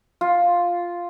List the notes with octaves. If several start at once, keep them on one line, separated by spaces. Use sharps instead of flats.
F4